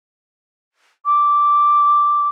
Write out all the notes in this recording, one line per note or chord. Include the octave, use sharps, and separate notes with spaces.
D6